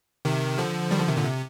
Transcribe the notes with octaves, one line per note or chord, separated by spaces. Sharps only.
C3 D#3
D3 F3
D#3 G3
D3 F3
C3 D#3
A#2 D3
C3